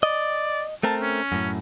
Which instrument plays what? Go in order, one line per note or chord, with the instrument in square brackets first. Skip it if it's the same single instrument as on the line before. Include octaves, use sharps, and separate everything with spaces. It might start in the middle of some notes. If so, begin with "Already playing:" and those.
[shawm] D5 [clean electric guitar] D#5
[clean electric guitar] A3 C4 A#4 [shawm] A5
[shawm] C#4
[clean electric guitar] F#2 A2